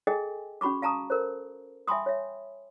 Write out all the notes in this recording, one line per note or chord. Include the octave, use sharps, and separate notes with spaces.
G#4 A4 D#5 G5 G#5
C#4 F#4 B5 C#6 D6
F5 A5 A#5 C#6 D#6
A4 A#4 C5
E5 G5 G#5 B5 C6 D#6
C#5 E5